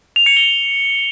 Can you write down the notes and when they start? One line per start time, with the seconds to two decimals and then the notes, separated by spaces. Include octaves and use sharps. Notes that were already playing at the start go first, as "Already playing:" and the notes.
0.16 F7
0.26 C#7
0.37 G7